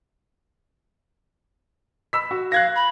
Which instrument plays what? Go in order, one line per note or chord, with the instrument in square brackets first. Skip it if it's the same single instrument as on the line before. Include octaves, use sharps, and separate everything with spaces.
[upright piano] B5 E6 B6
F#4
[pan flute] F5 [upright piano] F#6 G#6 A#6
[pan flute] B5